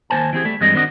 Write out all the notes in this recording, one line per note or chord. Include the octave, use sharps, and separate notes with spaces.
D#2 A3 C5 G#5 A5
E3 C4 G4 G#4
G3 A3
G2 E3 G3 G#3 C4 D#5
D#3 C4 D4 F#4 D#5